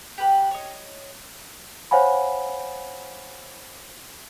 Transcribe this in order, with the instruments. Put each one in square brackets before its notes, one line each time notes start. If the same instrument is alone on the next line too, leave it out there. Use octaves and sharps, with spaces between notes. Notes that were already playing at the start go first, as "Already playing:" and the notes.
[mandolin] G4 B4
C#5 D#5
[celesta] C5 C#5 F5 F#5 G#5 B5